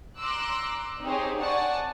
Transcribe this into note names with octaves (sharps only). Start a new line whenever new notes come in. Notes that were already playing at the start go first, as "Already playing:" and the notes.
A#5 C6 D6 E6 F#6
C4 D#4 G4 G#4 C5 C#5
D5 F#5 G#5 A5 C#6